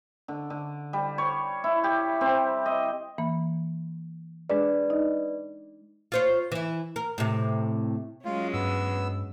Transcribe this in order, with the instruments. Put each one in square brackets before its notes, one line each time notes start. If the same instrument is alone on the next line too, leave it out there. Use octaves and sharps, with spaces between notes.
[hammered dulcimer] D3
D3
G3
C#5
E4
G4
C4
D#5
[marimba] E3 A#3 B5
[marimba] G#3 D4 G#4 [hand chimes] B4 D5
[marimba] D#4 D#5
[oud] F4 C5 C#5
E3 E4
A#4
A2 C3
[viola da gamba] F#3 G#3 C#4 [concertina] F4
[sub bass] G2 [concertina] B3 E6